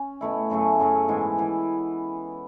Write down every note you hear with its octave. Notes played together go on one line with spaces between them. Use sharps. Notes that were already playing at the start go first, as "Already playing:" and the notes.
Already playing: C#4
B2 A3 E4
F#2 C#3 F#3 A3
F#2 C#3 F#3 A3
G#2 E3 B3 E4
E3 B3 E4